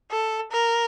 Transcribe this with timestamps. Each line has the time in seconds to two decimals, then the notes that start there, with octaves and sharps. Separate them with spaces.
0.11 A4
0.52 A#4